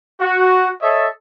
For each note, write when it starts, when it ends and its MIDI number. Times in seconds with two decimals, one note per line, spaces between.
0.21 0.69 66
0.82 1.07 69
0.82 1.07 73
0.82 1.07 75
0.82 1.07 76